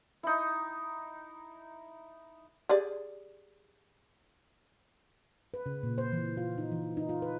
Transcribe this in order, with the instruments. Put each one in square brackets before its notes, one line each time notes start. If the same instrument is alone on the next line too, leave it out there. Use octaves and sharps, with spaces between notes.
[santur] D#4 E4
[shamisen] G4 G#4 D5
[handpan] B4
C#3
A#2
C5
E3
F4
D#4
E3
D#4
F4
B4